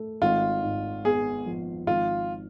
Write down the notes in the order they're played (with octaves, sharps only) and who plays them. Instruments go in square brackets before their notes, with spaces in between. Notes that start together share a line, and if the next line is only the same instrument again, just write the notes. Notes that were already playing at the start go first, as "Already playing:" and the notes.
Already playing: [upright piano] A3
[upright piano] G#1 [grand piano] F4
[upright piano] G#2
[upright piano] B3 [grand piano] G#4
[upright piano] F3
[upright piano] G#1 [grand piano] F4